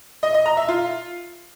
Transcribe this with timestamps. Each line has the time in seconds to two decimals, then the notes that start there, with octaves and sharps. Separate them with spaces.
0.23 D#5
0.34 D#5
0.46 A#5
0.57 E5
0.68 F4